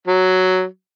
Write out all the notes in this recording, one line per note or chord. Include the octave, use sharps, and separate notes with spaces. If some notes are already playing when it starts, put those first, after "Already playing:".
F#3